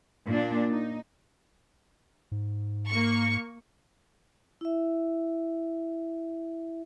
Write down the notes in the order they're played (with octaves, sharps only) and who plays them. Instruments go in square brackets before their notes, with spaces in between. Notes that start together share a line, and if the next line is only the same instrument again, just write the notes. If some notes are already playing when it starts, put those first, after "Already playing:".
[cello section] A#2 A#3 D4
D#4
[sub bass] G#2
[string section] A#3 C#6
[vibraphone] E4 E5